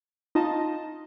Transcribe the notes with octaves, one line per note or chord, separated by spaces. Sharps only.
D#4 F4 D#5 A5